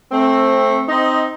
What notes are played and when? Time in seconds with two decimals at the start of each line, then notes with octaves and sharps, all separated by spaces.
0.11 A3 C4
0.88 C4 D#4